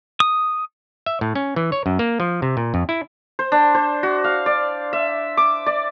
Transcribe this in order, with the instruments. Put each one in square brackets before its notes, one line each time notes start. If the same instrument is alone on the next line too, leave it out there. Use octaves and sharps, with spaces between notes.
[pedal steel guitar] D#6
[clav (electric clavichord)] E5
A2
C#4
E3
C#5
F#2
A#3
F3
C3
A#2
F2
E4
[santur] C5
D4
C5
F#4
F5
D5
E5
D6
D5